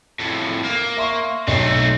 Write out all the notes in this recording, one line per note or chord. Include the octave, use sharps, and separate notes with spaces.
F2 A2
A#3
E5 C6 C#6
B1 A3 C4 C7